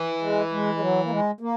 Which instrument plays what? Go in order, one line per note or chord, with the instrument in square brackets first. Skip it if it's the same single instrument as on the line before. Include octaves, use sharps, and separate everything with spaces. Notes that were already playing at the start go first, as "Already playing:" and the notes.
Already playing: [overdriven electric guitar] E3
[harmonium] G#3
G#3
G#3
F#3
A#3
G#3
A#3